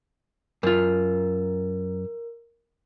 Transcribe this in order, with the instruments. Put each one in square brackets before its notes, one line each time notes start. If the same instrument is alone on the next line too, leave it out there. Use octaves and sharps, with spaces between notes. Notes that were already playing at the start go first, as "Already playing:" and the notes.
[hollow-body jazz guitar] F#2 F4 [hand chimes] A#4